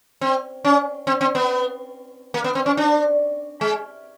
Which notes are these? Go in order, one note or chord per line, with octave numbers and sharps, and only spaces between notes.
C4
C#4
C4
C4
B3
A#3
B3
C4
C#4
D4
G#3